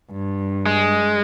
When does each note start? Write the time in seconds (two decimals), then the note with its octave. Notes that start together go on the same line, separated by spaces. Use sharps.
0.11 G2
0.66 G#3